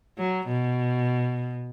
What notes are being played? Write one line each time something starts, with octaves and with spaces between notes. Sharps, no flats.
F#3
B2